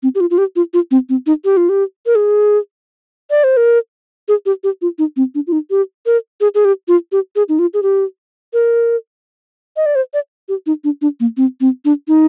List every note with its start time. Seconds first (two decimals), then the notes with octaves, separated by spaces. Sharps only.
0.03 C4
0.15 G4
0.20 F4
0.31 F4
0.38 G4
0.56 F4
0.74 F4
0.91 C4
1.09 C4
1.26 D#4
1.45 G4
1.57 F4
1.69 G4
2.06 A#4
2.15 G#4
3.31 D5
3.44 C5
3.57 A#4
4.28 G#4
4.46 G4
4.64 G4
4.82 F4
4.99 D#4
5.16 C4
5.35 D4
5.47 F4
5.52 D#4
5.70 G4
6.06 A#4
6.41 G#4
6.55 G#4
6.65 G4
6.88 F4
7.12 G4
7.36 G#4
7.49 D#4
7.59 F4
7.74 G#4
7.83 G4
8.53 A#4
9.77 D#5
9.86 D5
9.95 C5
10.14 D5
10.49 G4
10.66 D#4
10.84 D4
11.02 D4
11.20 A#3
11.37 C4
11.61 C4
11.85 D4
12.08 D#4